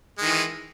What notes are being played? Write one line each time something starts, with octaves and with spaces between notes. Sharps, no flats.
D#3 E3 G#3